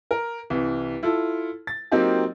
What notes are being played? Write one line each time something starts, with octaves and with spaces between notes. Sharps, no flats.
A#4
C2 E3
E4 F4 A4
A6
F#3 A#3 C4 D#4 F4 G4